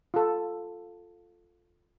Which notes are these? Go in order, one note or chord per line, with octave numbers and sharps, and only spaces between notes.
F4 A4